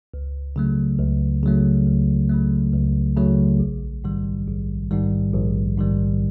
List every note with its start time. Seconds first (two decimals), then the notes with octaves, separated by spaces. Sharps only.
0.14 C#2
0.56 C#3 F#3 A3
0.99 C#2
1.43 C#3 F#3 A3
1.87 C#2
2.29 C#3 F#3 A3
2.73 C#2
3.17 C#3 F#3 A3
3.60 A#1
4.04 G#2 D#3 G3
4.47 A#1
4.91 G#2 D#3 G3
5.33 A#1
5.77 G#2 D#3 G3